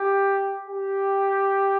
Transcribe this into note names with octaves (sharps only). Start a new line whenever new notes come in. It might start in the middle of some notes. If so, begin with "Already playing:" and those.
Already playing: G4
G4